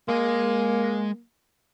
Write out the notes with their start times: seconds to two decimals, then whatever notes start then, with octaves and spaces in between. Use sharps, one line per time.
0.09 G#3 A#3 D#5